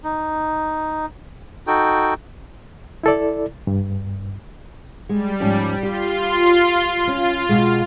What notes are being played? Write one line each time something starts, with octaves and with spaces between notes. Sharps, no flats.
D#4
D#4 F#4 A4 G5
E4 A4 D5
G2
G3 G#3
G#2 F3 C#4
F4 G4 C6
C#4 F4
B2 G#3